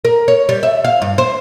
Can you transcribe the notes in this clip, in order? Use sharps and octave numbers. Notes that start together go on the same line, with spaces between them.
A#4
C#5
G3
E5
F5
G2
C5